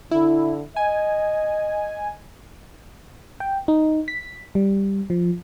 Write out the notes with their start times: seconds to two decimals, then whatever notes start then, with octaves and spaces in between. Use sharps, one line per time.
0.11 D3 E4
0.76 D#5 G#5
3.40 G5
3.68 D#4
4.08 B6
4.55 G3
5.10 F3